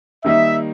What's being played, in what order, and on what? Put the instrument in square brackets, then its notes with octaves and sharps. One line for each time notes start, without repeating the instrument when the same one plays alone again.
[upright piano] D#3 G3 A#3 D#4 [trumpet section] E5